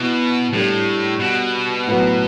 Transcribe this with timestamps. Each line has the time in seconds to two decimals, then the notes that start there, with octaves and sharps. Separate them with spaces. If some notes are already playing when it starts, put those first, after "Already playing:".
Already playing: B2 B3 E4
0.53 A2 G3 D4 A4
1.20 B2
1.87 A2 F#3 B3 F#4 B4